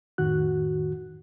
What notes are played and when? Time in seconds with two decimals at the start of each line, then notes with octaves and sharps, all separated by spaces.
0.18 F2 A2 D#3 F#4 F#6